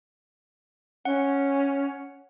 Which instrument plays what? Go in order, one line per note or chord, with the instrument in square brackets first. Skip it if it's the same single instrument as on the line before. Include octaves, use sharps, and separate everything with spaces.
[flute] C#4 [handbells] F#5